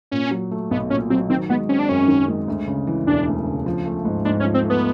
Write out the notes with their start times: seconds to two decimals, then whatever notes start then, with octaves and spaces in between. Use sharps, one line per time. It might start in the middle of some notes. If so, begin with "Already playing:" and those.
0.12 A#2 C#4
0.31 F#3
0.51 A3
0.71 B1 B3
0.90 A#2 C#4
1.10 F#3 C4
1.30 D#3 C4
1.49 G#3 B3
1.69 C4 C#4
1.79 D4
1.89 F#2 C#4
2.08 D#3
2.28 G#3
2.48 D2
2.68 C#3
2.87 E3
3.07 E1 D4
3.26 D2
3.46 C#3
3.66 F3
3.86 A3
4.05 G#2
4.25 G#2 D4
4.40 C#4
4.45 F3
4.54 C4
4.64 A3
4.70 B3